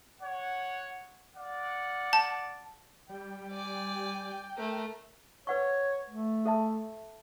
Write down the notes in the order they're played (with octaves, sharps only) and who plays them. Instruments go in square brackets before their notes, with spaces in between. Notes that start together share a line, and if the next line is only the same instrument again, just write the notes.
[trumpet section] C#5 F#5
D5 F5 F#5
[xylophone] A5
[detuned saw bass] G3 [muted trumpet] G5
[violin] D5 G#5
A3 A#4
[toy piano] B4 F#5 C#6 [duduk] C#5
[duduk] A3
[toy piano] A4 E5 A5